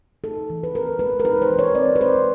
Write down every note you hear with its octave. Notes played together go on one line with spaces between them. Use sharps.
D#4 A4
E3
B4
C4 A#4
G#3 B4
A#4
D#4 B4
C5
E3
C#5
C4 D5
B4
G#3 C5